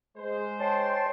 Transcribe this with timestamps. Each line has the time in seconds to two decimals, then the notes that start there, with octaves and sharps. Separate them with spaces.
0.18 G#3 C5
0.60 C#5 G5 A5 C6